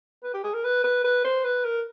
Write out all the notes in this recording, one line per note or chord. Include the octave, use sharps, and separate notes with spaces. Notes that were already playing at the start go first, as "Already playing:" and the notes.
B4
G4
G#4
A#4
B4
B4
B4
C5
B4
A#4